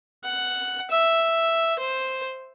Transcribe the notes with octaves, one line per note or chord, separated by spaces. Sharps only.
F#5
E5
C5